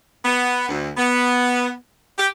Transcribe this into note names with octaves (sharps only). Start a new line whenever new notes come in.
B3
D2
B3
G4